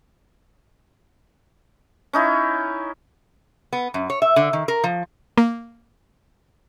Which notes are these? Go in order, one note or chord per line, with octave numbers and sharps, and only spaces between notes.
C#4 D#4 E4
B3
F#2
C#5
E5
D3
D#3
A#4
F3
A#3